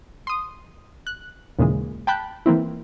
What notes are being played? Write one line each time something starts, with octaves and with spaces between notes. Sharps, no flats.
C6 D#6
F#6
D#2 A#2 C#3 E3 G#3
G5 A5 B5 F#6 G6
E3 A#3 C4 E4